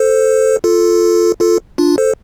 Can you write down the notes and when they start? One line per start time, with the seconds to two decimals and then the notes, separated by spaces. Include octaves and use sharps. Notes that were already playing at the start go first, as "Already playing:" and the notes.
Already playing: A4 C5
0.64 F4 A4
1.40 F4 A4
1.78 D4 F4
1.98 A4 C5